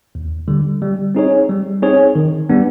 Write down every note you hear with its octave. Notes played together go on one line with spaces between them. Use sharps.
D#2
D3 G3
G3
C4 D#4 G#4 C#5
G3
C4 D#4 G#4 C#5
D#3
G3 B3 D4